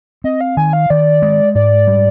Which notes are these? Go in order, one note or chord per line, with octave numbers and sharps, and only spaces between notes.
C4 D#5
F5
D#3 G#5
F5
D#3 D5
G#3
G#2 D5
G3